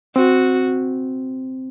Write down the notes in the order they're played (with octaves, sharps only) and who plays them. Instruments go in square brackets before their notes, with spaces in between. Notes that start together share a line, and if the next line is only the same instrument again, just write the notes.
[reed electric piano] C4 [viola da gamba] F#4